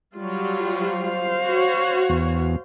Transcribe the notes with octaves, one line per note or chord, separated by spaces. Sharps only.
F#3 G3 F4
C5 F5
F#4 C#5
E2